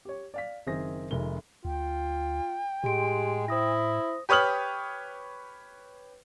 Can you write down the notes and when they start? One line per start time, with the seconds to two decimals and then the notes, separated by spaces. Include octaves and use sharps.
0.05 G4 C#5
0.34 D5 F5 B6
0.66 F#1 D#3 C4 G#4 E5 A#6
1.11 F1 C3 D#3 G#3 A#4 G7
1.65 D2 F4 G5
2.84 A2 G#3 G4 C6 D7
3.48 E4 C5 D#6 A#6
4.29 G4 B4 C#5 D#6 F6 F#7